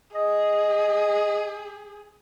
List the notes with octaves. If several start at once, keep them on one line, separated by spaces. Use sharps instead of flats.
G#4 D#5